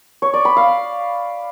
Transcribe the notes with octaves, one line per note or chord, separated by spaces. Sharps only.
C#5
D5
B5
F5